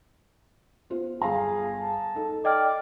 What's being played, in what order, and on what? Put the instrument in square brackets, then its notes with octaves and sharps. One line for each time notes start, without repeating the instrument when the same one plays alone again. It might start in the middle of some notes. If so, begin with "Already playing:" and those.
[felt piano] B3 F4 C5
[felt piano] G1 F5 A#5 [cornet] G#4
[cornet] A5
[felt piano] D#4 A4
[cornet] D5 [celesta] D#5 G5 F6